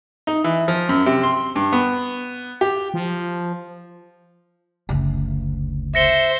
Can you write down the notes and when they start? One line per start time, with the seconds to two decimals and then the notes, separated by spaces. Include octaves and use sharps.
0.27 D#4
0.44 E3
0.68 F3
0.89 F#2
1.06 C3
1.23 C6
1.56 G2
1.73 B3
2.61 G4
2.94 F3
4.89 F#1 D2
5.95 C5 E5 A#6 C#7 G7